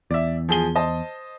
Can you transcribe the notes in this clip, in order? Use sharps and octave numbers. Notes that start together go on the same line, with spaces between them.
E2 D5 E5
F3 G#4 G7
C5 D#5 A5